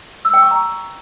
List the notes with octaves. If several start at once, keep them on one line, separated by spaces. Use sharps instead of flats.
E6
G5
C#6
A#5